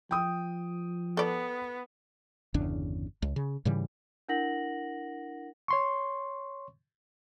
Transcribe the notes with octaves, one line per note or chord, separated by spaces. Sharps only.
F3 G5 D#6
B3 A4 D5
G1 E2 C#3 D4
C#2
C#3
G#2 C#3 E3 G3
D4 E4 A#4 F#5 A#6 F#7
C#5 C6 C#6